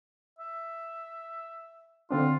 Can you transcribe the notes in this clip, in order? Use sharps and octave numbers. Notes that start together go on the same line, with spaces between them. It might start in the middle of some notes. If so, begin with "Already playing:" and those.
E5
D3 C4 D4 F4